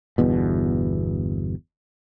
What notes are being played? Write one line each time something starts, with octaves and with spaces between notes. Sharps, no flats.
G1 E2 B2